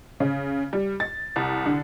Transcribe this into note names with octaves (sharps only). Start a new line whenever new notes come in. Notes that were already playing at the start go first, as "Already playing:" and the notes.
C#3
G3
A6
C2
D3